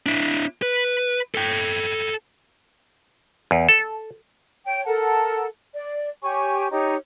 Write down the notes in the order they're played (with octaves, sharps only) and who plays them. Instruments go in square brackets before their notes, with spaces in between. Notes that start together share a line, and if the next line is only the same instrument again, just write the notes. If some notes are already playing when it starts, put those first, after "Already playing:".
[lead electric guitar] D4 E4
B4
A4 G5
[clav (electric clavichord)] E2
A4
[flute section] C#5 G5
A4 A#4 F#5 A5
D5
G4 C#5 G#5 C#6
D#4 G4 C#5